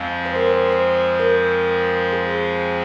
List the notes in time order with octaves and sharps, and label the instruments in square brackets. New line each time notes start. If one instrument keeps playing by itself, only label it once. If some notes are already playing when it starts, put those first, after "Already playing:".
Already playing: [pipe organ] F2 F3 G#3 C4 [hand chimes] F5
[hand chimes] C5
A#4
C5
C5
A#4
G#4